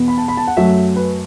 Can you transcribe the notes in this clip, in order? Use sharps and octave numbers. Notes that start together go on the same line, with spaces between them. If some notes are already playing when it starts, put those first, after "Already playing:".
Already playing: E2 B2 B3
B5
A5
B5
A5
F#5
F#2 F#3 A3 E5
B4